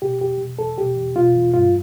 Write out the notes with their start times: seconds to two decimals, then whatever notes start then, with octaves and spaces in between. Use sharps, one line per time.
0.02 B2 G4
0.21 E2 G4
0.40 B2
0.58 E2 A4
0.78 B2 G4
0.97 E2
1.16 B2 F4
1.35 E2
1.54 G2 F4